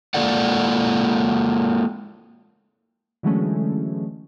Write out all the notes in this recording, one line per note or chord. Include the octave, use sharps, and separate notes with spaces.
G#3 A#3 F4 A4 D5 F#5
D3 E3 F#3 G#3 A3 C#4